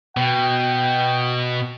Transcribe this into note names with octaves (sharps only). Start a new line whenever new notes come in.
B2 G5